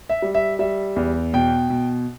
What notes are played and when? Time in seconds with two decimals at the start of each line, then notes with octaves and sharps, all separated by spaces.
0.09 E5
0.22 G3
0.35 E5
0.59 G3 E5
0.96 E2
1.34 B2 G5
1.70 B2